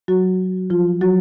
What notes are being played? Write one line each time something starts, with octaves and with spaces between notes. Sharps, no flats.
F#3 F#4
F3 F4
F#3 F#4